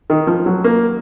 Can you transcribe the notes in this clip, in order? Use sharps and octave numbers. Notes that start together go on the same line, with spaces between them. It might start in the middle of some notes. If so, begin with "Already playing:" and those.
D#3
F3
F#3
A#3